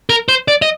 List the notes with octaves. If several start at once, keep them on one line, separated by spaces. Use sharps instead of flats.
A#4
C5
D5
D#5